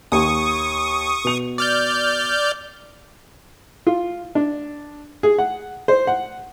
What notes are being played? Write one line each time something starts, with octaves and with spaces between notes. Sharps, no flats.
D#2 C#6 D#6
B2 F7
D5 F6 G6
F4
D4
G#4
F#5
C5
F#5